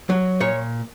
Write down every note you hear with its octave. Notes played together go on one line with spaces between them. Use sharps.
F#3
A#2 C#5